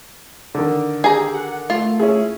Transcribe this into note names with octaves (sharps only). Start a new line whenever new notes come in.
D3 D#3
G4 G#4 A#5
F#5
A3 F4
C#4 E4 G#4